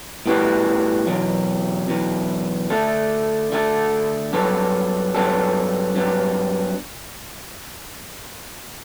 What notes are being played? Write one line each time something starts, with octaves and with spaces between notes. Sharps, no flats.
A2 G3 B3 D4 F#4
E2 B2 F#3
E2 B2 F#3
D3 A3 D4 A4
D3 A3 D4 A4
G2 F#3 B3 D4 A4
G2 F#3 B3 D4 A4
G2 F#3 B3 D4